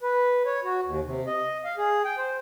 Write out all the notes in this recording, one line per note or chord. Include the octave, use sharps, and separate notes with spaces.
B4
C#5
F#4
D#2
C3
D#5
F5
G#4
G5
C5